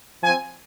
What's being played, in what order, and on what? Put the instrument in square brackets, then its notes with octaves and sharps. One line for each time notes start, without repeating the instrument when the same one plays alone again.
[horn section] F3 C4 G#5